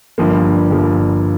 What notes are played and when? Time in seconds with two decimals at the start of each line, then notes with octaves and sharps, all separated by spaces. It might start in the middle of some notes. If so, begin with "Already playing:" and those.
0.18 G1 G2 F3 A#3
0.70 G1 G2 F3 A#3